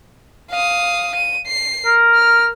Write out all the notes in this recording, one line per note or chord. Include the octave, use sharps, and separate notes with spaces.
F5 D#6
D#7
C7
A#4
F6